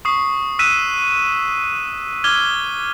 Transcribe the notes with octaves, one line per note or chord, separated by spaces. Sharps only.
C#6 D#6 C7
E6 F#6 B6 D#7 E7
D6 F6 G#6 G7